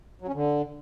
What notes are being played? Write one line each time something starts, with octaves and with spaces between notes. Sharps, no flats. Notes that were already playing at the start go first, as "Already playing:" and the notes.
F#3
C#4
D3